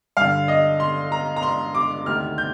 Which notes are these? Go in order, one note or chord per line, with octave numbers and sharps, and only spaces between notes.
G2 D3 F5
D#5
C6
A#5
A#5
C6
D6
D2 C3 D#3 F6
G6